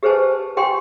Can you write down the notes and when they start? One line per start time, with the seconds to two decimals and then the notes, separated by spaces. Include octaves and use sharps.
0.03 G4 G#4 B4 C5 G#5 A5
0.57 G4 G5 G#5 C6